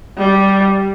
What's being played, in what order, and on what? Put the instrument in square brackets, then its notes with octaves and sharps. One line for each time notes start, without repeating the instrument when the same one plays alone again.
[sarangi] G3